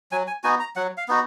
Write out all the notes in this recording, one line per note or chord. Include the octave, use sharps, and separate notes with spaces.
F#3 G#5
G#5
B3 D#4 F#4 G#5
A#5
F#3 F#5
F5
B3 D#4 F#4